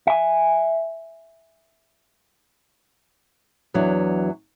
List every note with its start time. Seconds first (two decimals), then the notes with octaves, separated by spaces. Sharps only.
0.07 E5 G#5
3.74 E2 E3 F#3 D4